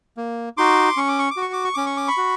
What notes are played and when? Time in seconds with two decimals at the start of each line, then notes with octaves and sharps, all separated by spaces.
0.17 A#3
0.57 D#4 F#4 C6 D6
0.97 C#4 C#6
1.08 D6
1.19 C#6
1.31 D6
1.37 F#4 C#6
1.53 D6
1.64 C#6
1.74 C#4 D6
1.86 C#6
1.97 D6
2.08 B5 C#6
2.17 F#4